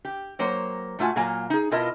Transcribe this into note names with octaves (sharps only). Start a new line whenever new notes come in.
G4
F#3 A#3 C5 C#5
A#2 A3 F4 F#4 G#5
A#2 F#3 A#3 F5 G#5 A#5
D#4 G#4
B2 E4 F4 A#4 D#5 A5